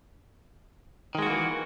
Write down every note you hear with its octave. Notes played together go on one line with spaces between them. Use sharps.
D#3 E3 G#3 A#3 F#4